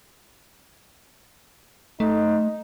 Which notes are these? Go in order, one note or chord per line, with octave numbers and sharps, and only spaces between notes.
A3 D#4